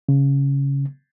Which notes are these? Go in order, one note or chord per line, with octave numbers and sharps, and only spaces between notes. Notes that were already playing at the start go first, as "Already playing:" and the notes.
C#3